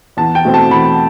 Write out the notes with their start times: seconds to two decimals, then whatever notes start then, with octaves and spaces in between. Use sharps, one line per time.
0.17 E2 A5
0.35 G5
0.45 B2 A3 C4
0.54 A5
0.71 E2 B5